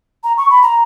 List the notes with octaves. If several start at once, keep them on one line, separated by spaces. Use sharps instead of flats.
A#5
C#6
B5
A#5